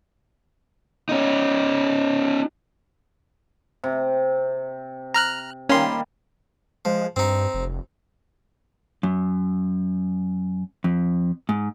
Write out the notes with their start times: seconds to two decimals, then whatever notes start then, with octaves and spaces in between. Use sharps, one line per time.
1.09 C#4 D#4
3.84 C3
5.14 A#5 F6 F#6
5.69 D#3 G3 A#3 C#4 C6
6.85 F3 G#3
7.16 G2 C4 D#4
7.54 F1
9.03 F#2
10.84 F2
11.49 G#2